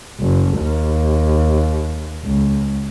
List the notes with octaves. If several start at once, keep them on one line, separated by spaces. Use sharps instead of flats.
F#1
D#2
C#2